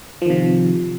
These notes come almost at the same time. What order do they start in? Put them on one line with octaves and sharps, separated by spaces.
F3 D#3 C3